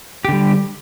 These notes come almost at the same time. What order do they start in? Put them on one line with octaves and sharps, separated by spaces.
G4 D3 G3